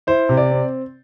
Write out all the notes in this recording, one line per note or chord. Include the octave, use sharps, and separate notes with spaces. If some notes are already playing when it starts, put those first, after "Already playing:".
E4 C5
C3
D5
C4